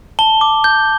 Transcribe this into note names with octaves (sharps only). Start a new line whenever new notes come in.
A5 G7
D6
G6